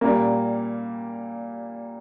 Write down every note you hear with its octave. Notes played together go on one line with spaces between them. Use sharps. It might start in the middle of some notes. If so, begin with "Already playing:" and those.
A#2 G3 A#3